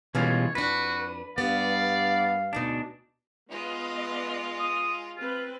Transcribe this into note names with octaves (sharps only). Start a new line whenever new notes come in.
B2 E3 G3 G#3 C#4 F4 C#5
F2 D4 F#4 B4
G2 B3 D5 F5
D2 G#2 B2 D4 D#4
G#3 B3 F4 B4 D#5
D#6
C4 F4 B4